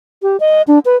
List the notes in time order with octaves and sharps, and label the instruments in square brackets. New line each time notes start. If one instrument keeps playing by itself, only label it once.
[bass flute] G4
D#5
D4
B4